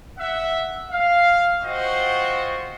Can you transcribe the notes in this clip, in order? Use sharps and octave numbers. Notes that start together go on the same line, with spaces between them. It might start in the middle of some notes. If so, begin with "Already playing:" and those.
E5 F#5
F5
F4 F#4 C5 D#5 G5 C#6